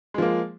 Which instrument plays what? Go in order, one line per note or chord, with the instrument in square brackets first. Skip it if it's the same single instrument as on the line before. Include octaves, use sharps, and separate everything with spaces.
[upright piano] G#3
F3
A#3